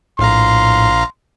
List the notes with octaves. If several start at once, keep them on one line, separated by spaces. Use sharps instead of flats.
A#1 A2 F5 A#5 C6